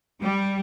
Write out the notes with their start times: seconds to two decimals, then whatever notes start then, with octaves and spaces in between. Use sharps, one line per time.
0.22 G3